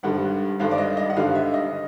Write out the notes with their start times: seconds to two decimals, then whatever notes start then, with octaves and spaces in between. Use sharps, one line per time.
0.03 G#1 G2 D3 G3 F#5
0.60 G#1 G2 D3 G3 F5
0.71 D5
0.78 D#5
0.97 D#5
1.10 F#5
1.17 G#1 G2 D3 G3 F5
1.35 E5
1.54 D#5